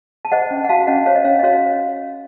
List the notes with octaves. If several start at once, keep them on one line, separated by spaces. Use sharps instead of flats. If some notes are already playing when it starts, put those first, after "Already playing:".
A5
C5 D#5 F#5
C#4
F#5
F#4 F5 A5
C#4 D#5 F#5
C5 C#5 F5
D#5
C#4 C#5 F5
D#5
F#4 C#5 F5